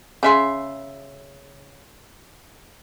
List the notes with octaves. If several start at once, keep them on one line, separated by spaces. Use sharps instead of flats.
C#3 E5 C6